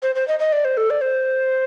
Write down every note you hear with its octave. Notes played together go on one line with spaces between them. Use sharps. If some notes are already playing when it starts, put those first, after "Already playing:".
C5
C5
D#5
D#5
D5
C5
A4
D5
C5